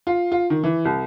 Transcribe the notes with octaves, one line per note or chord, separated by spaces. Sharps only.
F4
F4
D#3
E3
C2